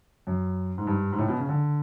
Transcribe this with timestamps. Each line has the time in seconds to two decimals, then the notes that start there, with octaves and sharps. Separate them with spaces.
0.27 F#2
0.78 G#2
0.87 G2
1.12 G#2
1.18 A2
1.28 B2
1.38 C#3
1.49 D3